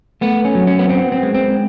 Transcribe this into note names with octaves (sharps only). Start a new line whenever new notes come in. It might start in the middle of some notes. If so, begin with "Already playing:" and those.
A3 B3
C#4
F#3
C#4
B3
B3 C4
C4
G#3
C4